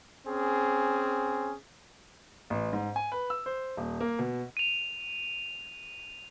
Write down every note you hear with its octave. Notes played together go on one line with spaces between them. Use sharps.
C4 C#4 G#4
A1
G#2
G#5
B4
E6
C5
D#1
A#3
B2
D#7 F7